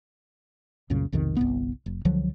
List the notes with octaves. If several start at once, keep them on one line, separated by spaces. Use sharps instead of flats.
C2 F#2 A#2 C#3
B1 F2 C3 D#3
G1 C2 B3
F1
C#2 D3 F3 F#3